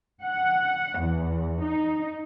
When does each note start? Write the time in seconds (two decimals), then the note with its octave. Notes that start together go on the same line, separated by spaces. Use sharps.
0.23 F#5
1.01 E2
1.64 D#4